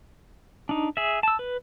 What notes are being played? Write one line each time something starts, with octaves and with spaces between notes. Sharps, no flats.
D4 D#4
G#4 E5
A5 E6
B4